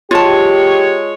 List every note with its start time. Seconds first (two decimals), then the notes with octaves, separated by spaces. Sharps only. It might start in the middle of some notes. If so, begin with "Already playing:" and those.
0.11 G#3 F4 G4 C#5 A5